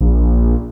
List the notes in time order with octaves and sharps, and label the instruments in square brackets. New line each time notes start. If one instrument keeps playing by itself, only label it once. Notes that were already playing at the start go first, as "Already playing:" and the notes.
[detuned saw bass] A#1